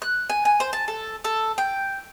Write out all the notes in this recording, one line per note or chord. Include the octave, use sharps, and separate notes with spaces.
F#6
G#5
G#5
C5
A5
A4
A4
G5